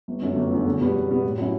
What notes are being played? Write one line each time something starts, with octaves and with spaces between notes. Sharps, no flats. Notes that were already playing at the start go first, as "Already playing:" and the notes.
G1
F#2 D3 A3
G1
F#2 D3 A3
E2
B2 G3 B3
E2
B2 G3 B3
A2
F#3 C#4 E4